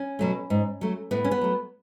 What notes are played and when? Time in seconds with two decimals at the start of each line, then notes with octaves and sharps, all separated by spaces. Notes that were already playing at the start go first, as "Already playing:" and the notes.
Already playing: C#4
0.19 B2 F#3 A3
0.50 G#2
0.81 F#3 A3
1.11 A2 B3
1.24 C#4
1.31 B3
1.41 F#3 A3